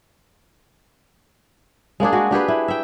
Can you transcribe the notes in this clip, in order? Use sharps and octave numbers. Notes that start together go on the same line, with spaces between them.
G#3 A#3 D4 G#4
G#3 F#4
D4 G4 G#4 B4
E4
E5 G5